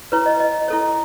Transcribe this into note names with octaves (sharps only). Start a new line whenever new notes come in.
E4 B4 C#5
D#5
D#5
E4 A4 C#5